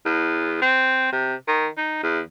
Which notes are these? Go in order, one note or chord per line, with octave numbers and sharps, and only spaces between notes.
E2
C4
C3
D#3
D#4
E2